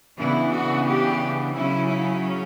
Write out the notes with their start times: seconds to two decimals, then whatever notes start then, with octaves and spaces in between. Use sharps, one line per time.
0.18 C#3 E3 B3 D4 E4
0.53 F#4
0.86 G4
1.54 C#3 F#3 C#4 E4
1.89 E4